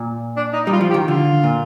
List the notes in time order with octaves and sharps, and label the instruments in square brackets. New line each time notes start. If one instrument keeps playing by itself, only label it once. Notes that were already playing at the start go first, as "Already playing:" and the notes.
Already playing: [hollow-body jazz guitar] A#2
[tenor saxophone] D4
D#4
D#4
[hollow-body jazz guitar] G3
[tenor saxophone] F4
[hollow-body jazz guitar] F3
[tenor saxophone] G4
[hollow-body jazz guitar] D#3
[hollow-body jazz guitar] D3 [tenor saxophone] F4
[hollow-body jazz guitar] A#2